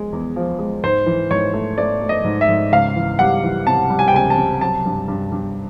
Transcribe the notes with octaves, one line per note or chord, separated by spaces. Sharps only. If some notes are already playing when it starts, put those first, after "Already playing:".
Already playing: G#3
E2
F3
G#3
G#2 C5
E3
G#2 C#5
A3
A3 D5
A3
D#5
G#2
E5
G#2
C#2 F5
E3
G3 F#5
E3
C3 A5
G3
G#5
G5
C#2 G#5
A5
C3
F#3 A5
G2
G2
G2